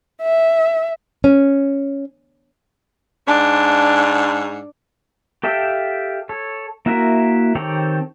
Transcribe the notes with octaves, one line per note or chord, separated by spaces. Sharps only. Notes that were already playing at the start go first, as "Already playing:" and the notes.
E5
C#4
G#2 D4
G4 A4 E5 F5 G5
A4 C#5
A#3 E4 F#4 A#4 E5
D#3 C4 G4 A4 C#5